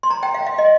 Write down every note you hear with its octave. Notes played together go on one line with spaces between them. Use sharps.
C6
A#5
G5
F5
F5
D#5